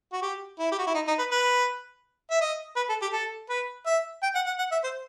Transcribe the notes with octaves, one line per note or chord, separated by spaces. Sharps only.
F#4
G4
E4
G4
F#4
E4
D#4
D#4
B4
B4
E5
D#5
B4
A4
G4
A4
B4
E5
G5
F#5
F#5
F#5
E5
C5